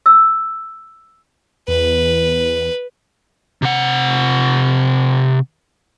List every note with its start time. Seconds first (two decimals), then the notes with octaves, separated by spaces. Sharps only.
0.06 E6
1.68 E2 B4
3.62 C3 F#5